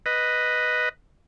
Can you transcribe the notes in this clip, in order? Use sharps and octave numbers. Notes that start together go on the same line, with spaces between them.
B4 D#5